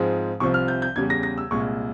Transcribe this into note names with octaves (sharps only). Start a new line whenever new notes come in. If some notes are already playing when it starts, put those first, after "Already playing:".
Already playing: G#2 F3 G#3 C4
C2 C3 F3 C4 C#6
F6
G6
G6
E2 C#3 G3 G#6
A#6
A#6
E6
C2 A#2 G#3 C#6